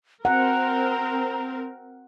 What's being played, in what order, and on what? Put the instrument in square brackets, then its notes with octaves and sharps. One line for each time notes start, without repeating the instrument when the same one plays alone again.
[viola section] C4 A#4 [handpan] F#5 [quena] A#5